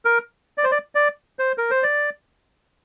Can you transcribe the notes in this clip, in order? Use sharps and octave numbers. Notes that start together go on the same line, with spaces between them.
A#4
D5
C5
D5
D5
C5
A#4
C5
D5